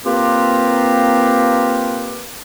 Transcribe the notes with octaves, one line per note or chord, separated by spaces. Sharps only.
A#3 C4 F4 G4 A#4 B4